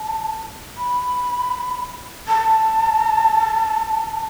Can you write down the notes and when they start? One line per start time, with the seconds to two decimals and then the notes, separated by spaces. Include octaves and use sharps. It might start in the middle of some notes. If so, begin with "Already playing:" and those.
Already playing: A5
0.77 B5
2.28 A5